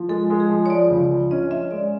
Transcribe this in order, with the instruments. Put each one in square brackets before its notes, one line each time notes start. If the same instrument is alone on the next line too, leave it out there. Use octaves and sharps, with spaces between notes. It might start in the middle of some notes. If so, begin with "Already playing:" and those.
Already playing: [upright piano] F3
[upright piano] G#3 [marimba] A4
[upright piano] G#3
[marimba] G#4
[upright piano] F3
[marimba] C#5
[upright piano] F3 [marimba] D5
[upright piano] C#2
F3
[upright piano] C#4 [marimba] D#5
[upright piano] C#4 [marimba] E5
[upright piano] G#3 [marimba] D5